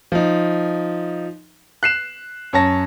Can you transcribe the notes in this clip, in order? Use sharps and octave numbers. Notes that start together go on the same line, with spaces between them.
F3 D#4
F#6 C7 E7
F#2 C#5 A5 A#6